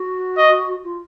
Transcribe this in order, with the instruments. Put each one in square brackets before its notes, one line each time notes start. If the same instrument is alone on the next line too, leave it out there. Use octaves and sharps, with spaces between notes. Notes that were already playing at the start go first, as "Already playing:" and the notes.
Already playing: [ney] F#4
[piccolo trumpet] D#5
[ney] F4